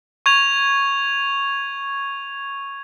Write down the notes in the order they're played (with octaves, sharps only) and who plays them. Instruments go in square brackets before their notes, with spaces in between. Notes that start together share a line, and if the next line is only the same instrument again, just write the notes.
[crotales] C#6 G#6 F7